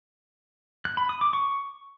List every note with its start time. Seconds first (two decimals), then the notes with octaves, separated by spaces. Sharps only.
0.85 F#6
0.97 B5
1.09 D#6
1.21 D6
1.33 C#6